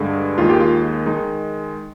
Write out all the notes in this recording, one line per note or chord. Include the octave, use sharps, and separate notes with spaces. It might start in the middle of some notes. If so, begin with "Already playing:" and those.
Already playing: G2 D3 G#3
D#2 D#3 G#3 F4
G4
F4
D#3 G#3 D#4